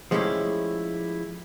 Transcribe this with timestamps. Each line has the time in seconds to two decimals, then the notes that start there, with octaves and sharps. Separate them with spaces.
0.11 F3 G#3 A3 C#4 E4 G4